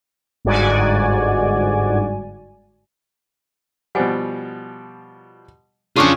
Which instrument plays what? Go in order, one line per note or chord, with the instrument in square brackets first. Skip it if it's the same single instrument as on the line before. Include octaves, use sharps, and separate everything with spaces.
[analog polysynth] G1 G#2 F#4 D5 G#5
[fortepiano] B2 F3 G3 [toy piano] F#5 G#5
[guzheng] C#3 D4 G#4 [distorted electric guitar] F4 G5 [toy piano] A5 C#6 D6